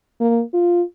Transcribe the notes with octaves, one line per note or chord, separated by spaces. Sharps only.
A#3
F4